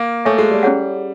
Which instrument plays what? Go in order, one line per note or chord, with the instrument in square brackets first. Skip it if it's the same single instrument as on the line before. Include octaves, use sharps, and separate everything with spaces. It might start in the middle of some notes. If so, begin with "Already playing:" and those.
Already playing: [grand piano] A#3
[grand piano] A3 [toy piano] A4 C#5 E5 G#5 C#6
[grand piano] G#3
G3
[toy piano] C#4 E4 G#4 C#5 F#5